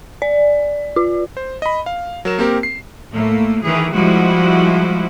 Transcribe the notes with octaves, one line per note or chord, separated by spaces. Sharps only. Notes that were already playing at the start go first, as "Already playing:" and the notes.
D5
F4
C5
D#5 B5
F5
F#3 A#4 E7
A#3 C4 G4 A#4
C7
A2 A3 A#3
D#3 E3 G#4
F3 G3 G#3 E4 F#4